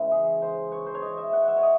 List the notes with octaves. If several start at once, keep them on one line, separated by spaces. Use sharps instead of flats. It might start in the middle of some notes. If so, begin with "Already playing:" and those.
Already playing: C#3 E3 G#3
G#4
C5
C#5
C5
C#5
D#5
E5
F#5
E5
C#5
D#5